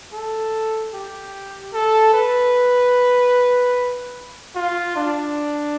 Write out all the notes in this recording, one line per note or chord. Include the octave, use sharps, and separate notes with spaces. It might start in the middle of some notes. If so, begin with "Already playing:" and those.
A4
G4
A4
B4
F4
D4